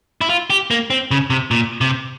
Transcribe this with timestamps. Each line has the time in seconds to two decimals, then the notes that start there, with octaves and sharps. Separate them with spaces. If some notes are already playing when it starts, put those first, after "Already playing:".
0.21 E4
0.30 F4
0.50 G4
0.71 A#3
0.90 C4
1.11 C#3
1.30 C3
1.51 A#2
1.81 C3